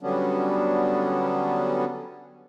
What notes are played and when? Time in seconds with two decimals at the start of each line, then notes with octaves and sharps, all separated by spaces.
0.01 D3 F#3 G3 B3 C#4 D4